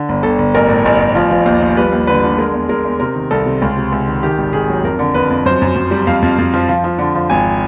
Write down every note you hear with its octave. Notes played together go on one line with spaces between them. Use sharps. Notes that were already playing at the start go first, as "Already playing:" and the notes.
Already playing: D3
G1
G1 A4
G1
A1 A#4
A2
A1
A1
F3
F3
D#2
F3
G3 B4
D#2
D3 B4
D3
G#3 A#4
E2
G#3 A#4
E2
C3 A#4
D#3
C2 A4
C3
C#2
C3
C#2
D#3
D#3 G4
G#1
D#3 G#4
F#3
F2 A#4
D3
F2 B4
F2
F#2 C5
F#2
F#2
G3
F2 F5
F2
F2
F3
F3
F3
D3
F3
G#1 G#5